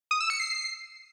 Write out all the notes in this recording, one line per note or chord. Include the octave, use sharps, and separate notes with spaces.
D#6
E6
C#7
C7